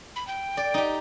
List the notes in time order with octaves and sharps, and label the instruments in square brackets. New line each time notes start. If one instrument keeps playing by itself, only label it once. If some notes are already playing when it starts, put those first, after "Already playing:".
[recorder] B5
G5
[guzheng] D5
D#4 G4